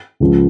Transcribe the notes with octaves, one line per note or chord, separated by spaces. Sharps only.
C#2 C#3 F3